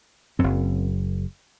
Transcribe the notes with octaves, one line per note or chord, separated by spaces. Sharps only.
F#1 F#2 C4